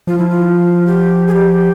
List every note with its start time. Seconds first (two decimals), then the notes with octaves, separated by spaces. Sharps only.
0.07 F3 F4
0.18 E4
0.29 F4
0.87 G4
1.27 G#4
1.32 G4